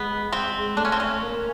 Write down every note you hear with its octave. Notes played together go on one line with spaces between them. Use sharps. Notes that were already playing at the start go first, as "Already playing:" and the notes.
Already playing: G#3 B3
C4
A3 D4
C#4
C4
C#4
A#3